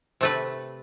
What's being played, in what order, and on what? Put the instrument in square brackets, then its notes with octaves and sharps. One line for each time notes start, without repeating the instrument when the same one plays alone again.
[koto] C3 A3 B4